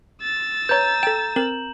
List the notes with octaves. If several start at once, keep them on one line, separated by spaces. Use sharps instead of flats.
E6 A6
B4 C#5 A#5 G6
A4 G5 E7
C4 A#4 F#7